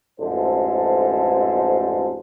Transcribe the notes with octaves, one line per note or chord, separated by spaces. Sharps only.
A1 F2 G#2 D3 A4 C5